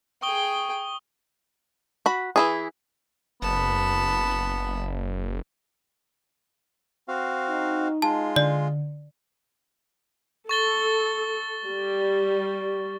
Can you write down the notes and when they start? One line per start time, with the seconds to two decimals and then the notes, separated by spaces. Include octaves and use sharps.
0.22 G#4 G5 C#6 D#6 G7
2.06 F#4 B5
2.36 E3 E4 G#4
3.42 F#1 B3 A5 B5
7.08 C4 F#4 F5
7.50 D#4
8.02 G#3 F4 A5
8.36 D3 D5
10.49 A4 C#6 A6 G7
11.66 G3